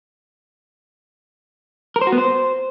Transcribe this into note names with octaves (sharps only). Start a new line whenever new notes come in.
A#4
C5
F#4
B3
C5